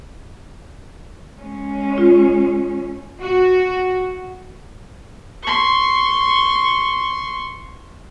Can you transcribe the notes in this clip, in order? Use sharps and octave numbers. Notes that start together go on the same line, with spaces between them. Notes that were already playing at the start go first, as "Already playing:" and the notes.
G#3 C#4
F4
F#4
C6 C#6